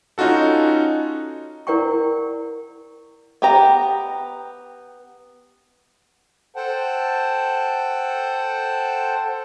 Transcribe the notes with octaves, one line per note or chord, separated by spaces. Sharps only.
C#4 D#4 F4 F#4 A4
E4 A#4 D5 F#5 G5 C#6
B3 G4 A#5
A4 C5 F#5 G5 A5